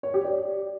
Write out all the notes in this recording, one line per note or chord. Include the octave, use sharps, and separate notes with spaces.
C#5
G4
D5